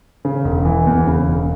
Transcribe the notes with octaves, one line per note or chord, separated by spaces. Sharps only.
C#3
E1
E3
E2
C#3
E1